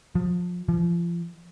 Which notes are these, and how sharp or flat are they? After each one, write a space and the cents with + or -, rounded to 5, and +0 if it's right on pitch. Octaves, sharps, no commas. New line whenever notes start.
F3 +25
F3 -30